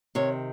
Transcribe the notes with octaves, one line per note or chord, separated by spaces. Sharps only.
C3 D#3 C#5